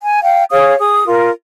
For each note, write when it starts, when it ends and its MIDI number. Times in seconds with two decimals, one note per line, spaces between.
0.03 0.22 80
0.23 0.43 77
0.23 0.43 79
0.51 0.74 68
0.51 0.74 73
0.51 0.74 77
0.51 0.74 87
0.80 1.03 68
0.80 1.03 87
1.06 1.30 65
1.06 1.30 70